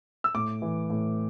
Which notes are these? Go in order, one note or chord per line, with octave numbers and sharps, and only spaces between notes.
E6
A2 D6
E3
A2